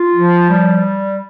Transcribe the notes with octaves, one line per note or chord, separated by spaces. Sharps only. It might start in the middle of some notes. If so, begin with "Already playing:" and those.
Already playing: F4
F3
G3